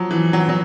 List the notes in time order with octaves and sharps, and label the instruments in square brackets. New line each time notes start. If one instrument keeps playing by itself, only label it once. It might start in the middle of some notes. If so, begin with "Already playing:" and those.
Already playing: [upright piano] F3 F#3
E3
F#3
F#3